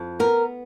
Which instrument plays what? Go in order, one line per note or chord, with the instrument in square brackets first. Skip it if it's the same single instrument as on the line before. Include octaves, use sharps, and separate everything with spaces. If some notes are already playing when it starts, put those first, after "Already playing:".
Already playing: [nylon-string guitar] F2
B3 A#4